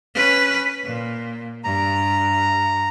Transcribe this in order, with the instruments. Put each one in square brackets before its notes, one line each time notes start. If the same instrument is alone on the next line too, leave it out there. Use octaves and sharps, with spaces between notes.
[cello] C#4 B4
A#2
[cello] G2 [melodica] A#5